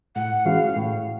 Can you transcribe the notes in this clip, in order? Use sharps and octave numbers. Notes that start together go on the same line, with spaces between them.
A2 F#5
E3 G#3 C#4 F#4 F5
A2